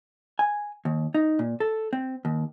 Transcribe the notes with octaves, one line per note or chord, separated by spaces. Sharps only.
G#5
D#2
D#4
A#2
A4
C4
D#2